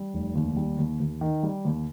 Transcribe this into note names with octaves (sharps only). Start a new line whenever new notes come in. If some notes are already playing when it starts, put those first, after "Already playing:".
Already playing: G3
F1
D#2
G3
D#2
D#2
D#3
G3
D#2